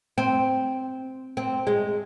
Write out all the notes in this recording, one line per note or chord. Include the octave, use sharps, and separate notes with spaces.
C4
C4
G#3